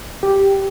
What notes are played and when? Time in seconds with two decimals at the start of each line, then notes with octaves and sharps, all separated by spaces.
0.23 G4